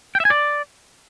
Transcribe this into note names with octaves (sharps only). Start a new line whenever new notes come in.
G5
E5
G#5
D5